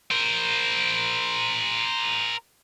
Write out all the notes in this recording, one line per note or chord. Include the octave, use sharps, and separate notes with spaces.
A#4 C5